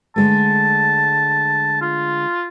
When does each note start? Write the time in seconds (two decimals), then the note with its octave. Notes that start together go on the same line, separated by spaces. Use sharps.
0.16 D3 G#3 A3 A5
1.81 F4